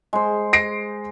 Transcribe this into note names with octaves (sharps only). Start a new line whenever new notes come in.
G#3 C5
A#6 C7 D7